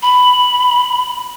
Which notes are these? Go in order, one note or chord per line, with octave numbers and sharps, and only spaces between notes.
B5